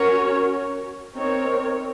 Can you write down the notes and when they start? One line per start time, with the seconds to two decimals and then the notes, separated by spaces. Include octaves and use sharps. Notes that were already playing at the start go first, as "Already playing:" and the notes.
Already playing: C#4 F#4 A#4 C#5
1.14 C4 D#4 A#4 C#5